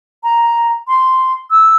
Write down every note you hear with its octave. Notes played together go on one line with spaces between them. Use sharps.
A#5
C6
E6